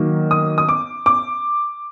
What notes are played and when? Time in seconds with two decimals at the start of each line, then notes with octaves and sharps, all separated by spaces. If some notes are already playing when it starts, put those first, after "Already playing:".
Already playing: D#3 F#3 A#3
0.31 D#6
0.58 D#6
0.69 D6
1.06 D6